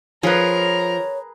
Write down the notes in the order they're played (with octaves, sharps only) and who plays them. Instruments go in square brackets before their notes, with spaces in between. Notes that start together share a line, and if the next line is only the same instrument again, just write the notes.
[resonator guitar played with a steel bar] F3 [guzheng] G#4 B4 [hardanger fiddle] A#4 A#5 [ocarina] C#5